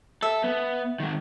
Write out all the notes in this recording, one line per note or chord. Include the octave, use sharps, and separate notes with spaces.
A4 E5
B3
D#3 G#3